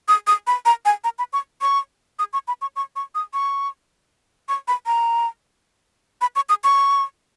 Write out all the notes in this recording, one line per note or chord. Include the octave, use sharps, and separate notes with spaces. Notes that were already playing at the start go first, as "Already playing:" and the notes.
D#6
D#6
B5
A#5
G#5
A#5
B5
C#6
C#6
D#6
C#6
B5
C#6
C#6
C#6
D#6
C#6
C#6
B5
A#5
B5
C#6
D#6
C#6